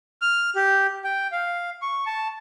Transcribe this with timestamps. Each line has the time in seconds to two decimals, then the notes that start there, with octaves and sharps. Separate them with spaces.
0.22 F6
0.56 G4
1.04 G5
1.32 F5
1.82 C#6
2.06 A5